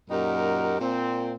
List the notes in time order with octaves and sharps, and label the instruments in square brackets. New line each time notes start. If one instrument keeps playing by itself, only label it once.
[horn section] F#2 A#2 D#4 G4 A#4 F#5
A#2 C4